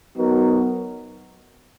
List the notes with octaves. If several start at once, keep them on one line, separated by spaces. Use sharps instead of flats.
F#3 B3 D#4 F#4 A#4